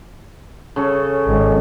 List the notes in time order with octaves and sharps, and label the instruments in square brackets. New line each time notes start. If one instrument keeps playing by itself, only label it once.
[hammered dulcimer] C#3 C#4 A4
[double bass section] G#1